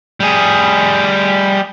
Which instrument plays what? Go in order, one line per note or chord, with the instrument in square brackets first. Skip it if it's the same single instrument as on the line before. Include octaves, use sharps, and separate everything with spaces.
[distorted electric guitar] G3 G#4